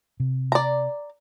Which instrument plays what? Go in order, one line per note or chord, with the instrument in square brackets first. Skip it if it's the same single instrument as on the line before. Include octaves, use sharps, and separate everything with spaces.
[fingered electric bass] C3
[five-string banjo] D5 A#5